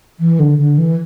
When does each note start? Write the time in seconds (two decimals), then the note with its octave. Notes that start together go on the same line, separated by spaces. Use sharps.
0.20 E3
0.39 D3
0.58 D3
0.78 E3